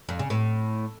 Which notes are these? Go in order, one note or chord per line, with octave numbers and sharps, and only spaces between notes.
F2
C#3
A2